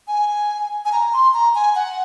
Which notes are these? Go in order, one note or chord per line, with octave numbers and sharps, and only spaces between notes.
G#5
G#5
A#5
C6
A#5
G#5
F#5